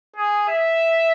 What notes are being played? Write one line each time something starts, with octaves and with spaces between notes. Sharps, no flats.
G#4
E5